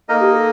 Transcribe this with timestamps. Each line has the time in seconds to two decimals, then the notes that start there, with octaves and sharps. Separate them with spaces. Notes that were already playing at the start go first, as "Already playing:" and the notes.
0.08 A#3 D#4 A4 A#4 D#5
0.21 G4
0.32 A4